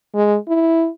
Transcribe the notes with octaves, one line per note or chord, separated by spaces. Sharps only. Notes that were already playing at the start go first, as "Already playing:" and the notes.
G#3
E4